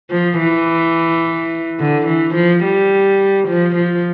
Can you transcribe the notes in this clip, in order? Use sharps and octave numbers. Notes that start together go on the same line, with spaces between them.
F3
E3
D3
E3
F3
G3
F3
F3